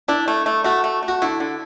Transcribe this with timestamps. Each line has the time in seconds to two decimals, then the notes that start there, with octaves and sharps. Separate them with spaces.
0.08 D4 E4
0.28 A3
0.46 A3
0.64 A3 F#4
0.84 A3
1.03 A3
1.08 F#4
1.22 D3 E4
1.40 D3